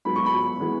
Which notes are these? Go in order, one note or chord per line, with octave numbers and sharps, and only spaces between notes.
G#2 F#3 B3 B5
C#6
B5
E3 G#3 B3